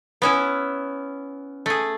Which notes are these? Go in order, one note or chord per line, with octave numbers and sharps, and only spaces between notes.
B3 C#4 E4
A3 G#4